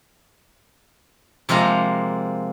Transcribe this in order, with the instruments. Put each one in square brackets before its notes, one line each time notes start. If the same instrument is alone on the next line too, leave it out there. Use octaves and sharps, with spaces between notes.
[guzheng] C3 F3 G#3 A#3 A#5